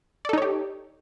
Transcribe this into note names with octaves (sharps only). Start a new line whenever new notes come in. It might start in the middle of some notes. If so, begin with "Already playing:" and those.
D#4 G4 A4 C#5 D5